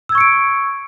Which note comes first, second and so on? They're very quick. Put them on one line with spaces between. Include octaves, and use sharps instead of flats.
E6 G#6 C#6 C#7 D7